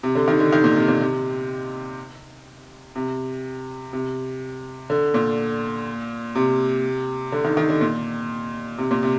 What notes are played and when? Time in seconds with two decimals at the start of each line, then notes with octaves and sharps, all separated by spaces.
0.03 C3
0.15 D3
0.28 D#3
0.40 D3
0.52 D#3
0.64 A#2
0.76 C3
0.88 A#2
1.00 C3
2.96 C3
3.93 C3
4.90 D3
5.14 A#2
6.35 C3
7.32 D3
7.45 D#3
7.57 D#3
7.69 D3
7.81 A#2
8.78 C3
8.91 A#2
9.03 C3